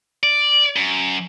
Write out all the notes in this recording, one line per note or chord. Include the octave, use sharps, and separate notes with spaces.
D5
F#2